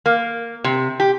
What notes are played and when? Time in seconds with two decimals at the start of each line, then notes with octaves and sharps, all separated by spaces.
0.06 A#3
0.64 C3
1.00 G4